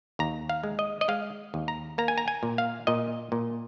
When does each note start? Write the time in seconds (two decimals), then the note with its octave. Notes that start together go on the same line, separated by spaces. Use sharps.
0.19 D#2 A#5
0.49 F5
0.63 G#3
0.79 D#5
1.01 D#5
1.08 G#3 F5
1.54 D#2
1.68 A#5
1.98 A#3 A#5
2.08 G#5
2.18 A#5
2.28 G#5
2.43 A#2
2.58 F5
2.87 A#2 D#5
3.32 A#2